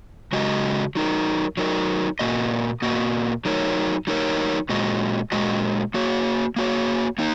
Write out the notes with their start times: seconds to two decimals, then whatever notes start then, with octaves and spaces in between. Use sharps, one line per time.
0.33 C#3 G#3 F#4 D#5
0.95 F#3 D#4 A#4
1.57 F#3 D#4 A#4
2.19 A#2 A#3 F#4 D#5
2.82 A#2 A#3 F#4 D#5
3.45 F#3 D#4 A#4 C#5
4.07 F#3 D#4 A#4 C#5
4.69 A#2 G#3 F#4 D#5
5.32 A#2 G#3 F#4 D#5
5.94 A#3 F#4 C#5
6.56 A#3 F#4 C#5
7.18 A#3 D#4